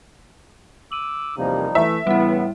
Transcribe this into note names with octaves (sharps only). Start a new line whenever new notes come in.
D6 E6 D#7 F#7
E2 C3 F3 G3 A#3 D#4
E3 A3 E5
A2 C#3 E3 G3 B3 E4